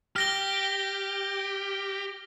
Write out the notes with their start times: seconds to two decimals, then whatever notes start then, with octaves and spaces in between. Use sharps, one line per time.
0.16 G4 F6 A#6 G7